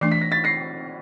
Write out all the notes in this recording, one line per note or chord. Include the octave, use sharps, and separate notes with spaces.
E3 A3 D4 C7
B6
A#6
A6 B6
A#6 C7